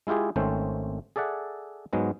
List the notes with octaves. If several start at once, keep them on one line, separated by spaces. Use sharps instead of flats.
G#3 E4 F4 G4 G#4
G#1 D#3 A3 C4 C#4 C5
G#4 A4 D5 E5 F#5
G#2 F#3 G#3 B3